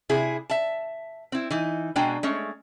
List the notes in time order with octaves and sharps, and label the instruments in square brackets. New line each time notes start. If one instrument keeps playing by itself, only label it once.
[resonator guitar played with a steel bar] C3 E4 G#4
E5 A5
C4 E4
E3 D#4
B2 G#3 D4 G5 G#5 A#5
G#3 A3 C#4